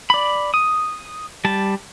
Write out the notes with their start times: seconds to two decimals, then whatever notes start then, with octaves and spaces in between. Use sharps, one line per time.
0.10 D5 B5
0.54 D#6
1.45 G3 A5